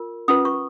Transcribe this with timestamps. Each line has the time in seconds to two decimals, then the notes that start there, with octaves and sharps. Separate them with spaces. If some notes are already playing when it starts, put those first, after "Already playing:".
Already playing: F4 A#4
0.28 C#4 F4 B4 D#6
0.45 C#6